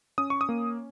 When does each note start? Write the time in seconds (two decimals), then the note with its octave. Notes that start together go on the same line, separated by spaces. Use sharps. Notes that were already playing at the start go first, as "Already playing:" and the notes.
0.18 C#4 D#6
0.30 C#6
0.41 D#6
0.49 A#3